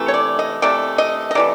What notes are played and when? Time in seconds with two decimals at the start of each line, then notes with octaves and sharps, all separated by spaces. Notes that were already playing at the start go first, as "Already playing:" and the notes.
Already playing: C3 E3 A3
0.08 C#5
0.14 D5
0.39 D#5
0.62 C3 E3 A3 D5
0.98 D#5
1.31 D#5
1.35 C3 E3 A3 D5